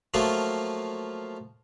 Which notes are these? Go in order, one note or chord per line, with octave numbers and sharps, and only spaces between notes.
F3 F#3 A3 A#3 F4